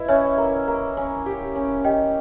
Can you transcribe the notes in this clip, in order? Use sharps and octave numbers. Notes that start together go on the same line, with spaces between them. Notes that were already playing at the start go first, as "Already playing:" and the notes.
Already playing: E4 B4 D#5
C#4 C#5 E5
A#3
A#3
C#4
G4
C#4
G4 D#5 G5